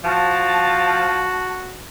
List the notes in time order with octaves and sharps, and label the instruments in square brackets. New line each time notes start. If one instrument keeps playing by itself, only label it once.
[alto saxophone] F3 [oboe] F#4 [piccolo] A5